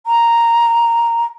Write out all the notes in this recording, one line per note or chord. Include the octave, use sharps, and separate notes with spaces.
A#5